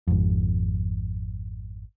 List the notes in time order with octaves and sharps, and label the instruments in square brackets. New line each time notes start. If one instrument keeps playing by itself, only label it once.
[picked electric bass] G#1 F2